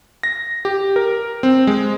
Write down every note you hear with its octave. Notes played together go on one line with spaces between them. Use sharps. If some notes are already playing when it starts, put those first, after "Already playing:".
A#6
G4
A#4
C4
G#3